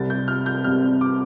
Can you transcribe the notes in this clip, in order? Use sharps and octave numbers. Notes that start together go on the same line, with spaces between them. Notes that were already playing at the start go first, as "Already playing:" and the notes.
Already playing: C2 C3 G3 A6
G6
F6
G6
C2 C3 G3 F6
D6